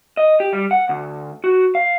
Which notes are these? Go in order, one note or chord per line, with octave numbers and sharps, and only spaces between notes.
D#5
G4
G3
F#5
D2
F#4
F5